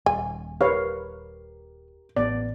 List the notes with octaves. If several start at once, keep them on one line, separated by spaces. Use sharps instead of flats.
D#1 G#5
G4 A#4 B4 C#5 F5
A1 B3 D5